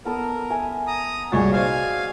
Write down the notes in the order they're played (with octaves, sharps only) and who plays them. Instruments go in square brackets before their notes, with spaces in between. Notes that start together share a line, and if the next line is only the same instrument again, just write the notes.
[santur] B3 A4 D#5 [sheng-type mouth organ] A#4
[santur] E5 G#5
[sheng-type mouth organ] A#5 D#6
[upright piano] C2 A#2 A6 [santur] F#4 G#4 [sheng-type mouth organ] C#5
[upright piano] D#4 C5 D5 [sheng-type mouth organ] F5 G#5